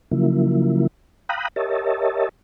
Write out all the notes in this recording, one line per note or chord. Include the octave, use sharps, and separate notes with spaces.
C#3 F3 F#3 A#3 E4
F5 G5 A#5 B5 D#6 F#6
G4 A#4 C#5 D#5 E5 A5